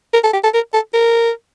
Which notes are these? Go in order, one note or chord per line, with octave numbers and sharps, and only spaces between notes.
A#4
A4
G4
A4
A#4
A4
A#4